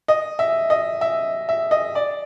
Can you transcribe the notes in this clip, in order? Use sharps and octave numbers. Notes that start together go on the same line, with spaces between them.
D#5
E5
D#5
E5
E5
D#5
D5